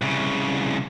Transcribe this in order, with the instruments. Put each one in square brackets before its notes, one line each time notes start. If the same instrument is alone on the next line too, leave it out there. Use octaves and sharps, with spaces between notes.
[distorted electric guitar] C2 C#3